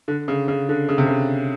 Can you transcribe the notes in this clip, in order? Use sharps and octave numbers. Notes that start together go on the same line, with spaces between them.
D3
C#3
C#3
D3
C#3
C3
C#3